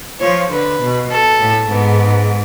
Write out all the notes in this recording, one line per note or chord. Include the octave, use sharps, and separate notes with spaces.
F3 C#5
D3 B4
B2
A4
A2
G#2 B3